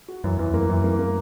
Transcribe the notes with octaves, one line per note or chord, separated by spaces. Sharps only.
F#4
F#2 E3
E2 E3
F#2 A#3
F#2 E3
A#3
A#3